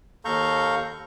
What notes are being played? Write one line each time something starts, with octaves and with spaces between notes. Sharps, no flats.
D#2 A4 F5 A#5 C#6 G6